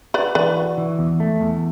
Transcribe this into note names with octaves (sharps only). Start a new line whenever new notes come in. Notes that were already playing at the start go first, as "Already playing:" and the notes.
F#4 B4 D5
E3 B4 D5
F#4
E3
E2
A3
E2